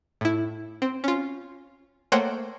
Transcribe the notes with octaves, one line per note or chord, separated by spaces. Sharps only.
A2 E4
C4
C#4 F4
A3 A#3 C5 C#5 F#5 G5